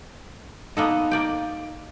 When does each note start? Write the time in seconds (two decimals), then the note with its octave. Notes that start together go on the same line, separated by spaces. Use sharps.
0.77 A#3 B3 D#4 A4
1.11 A#3 D5 G5